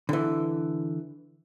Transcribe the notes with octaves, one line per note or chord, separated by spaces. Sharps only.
D3 E3